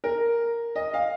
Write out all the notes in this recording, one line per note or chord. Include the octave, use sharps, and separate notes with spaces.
A#4
D#5
F5